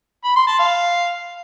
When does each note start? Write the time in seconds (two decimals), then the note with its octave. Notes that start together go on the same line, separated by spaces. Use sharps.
0.25 B5
0.36 C6
0.48 A5
0.59 F5